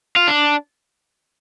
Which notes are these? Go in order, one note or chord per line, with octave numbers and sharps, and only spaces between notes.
F4
D4